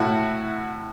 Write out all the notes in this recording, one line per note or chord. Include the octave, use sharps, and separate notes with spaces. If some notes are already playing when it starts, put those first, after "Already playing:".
Already playing: A2 E4 F#4